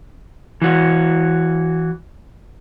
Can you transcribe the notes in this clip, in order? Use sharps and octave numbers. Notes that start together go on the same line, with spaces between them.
E3 F#4